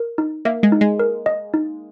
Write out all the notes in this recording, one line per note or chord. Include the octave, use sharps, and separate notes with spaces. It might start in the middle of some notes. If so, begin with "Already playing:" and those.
Already playing: A#4
D#4
A#3 E5
G#3
D#4
G#3
A#4
D#5
D#4